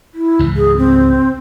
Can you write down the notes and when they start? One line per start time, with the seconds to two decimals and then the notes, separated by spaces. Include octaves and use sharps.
0.14 E4
0.39 C#2 G#2 E3
0.56 G#4
0.77 C4